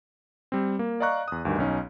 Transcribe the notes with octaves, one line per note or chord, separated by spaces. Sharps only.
G3 C4
A#3
D5 D#5 F5 A#5 C#6 F#6
E2 D#6
D2 G2 D#3
B1 C#4 D#4